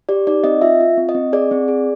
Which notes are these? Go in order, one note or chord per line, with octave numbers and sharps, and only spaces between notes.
G4 D5
D#4 D5
C4 D#5
F4 E5
F4
C4
D#5
C4
G#4 D5
C4
G#4